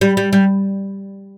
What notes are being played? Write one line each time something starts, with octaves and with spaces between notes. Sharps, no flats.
G3
G3
G3